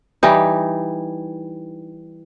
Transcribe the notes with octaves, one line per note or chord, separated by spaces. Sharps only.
E3 G3 D#4